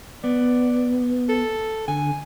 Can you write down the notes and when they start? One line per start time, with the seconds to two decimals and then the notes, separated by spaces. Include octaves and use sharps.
0.24 B3 D5
1.29 A4
1.88 D3 G#5